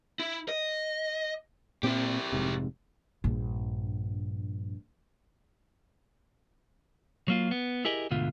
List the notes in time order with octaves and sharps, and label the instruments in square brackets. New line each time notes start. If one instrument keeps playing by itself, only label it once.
[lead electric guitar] E4
D#5
[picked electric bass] A#2 C4 [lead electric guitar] E4 G4
[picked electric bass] F1 G#2 C3
[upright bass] A#1 G2
[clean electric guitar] F#3 A#3 F4
B3
E4 G4 G#4 A#4 D#5
D2 G#2 B2 D3 F4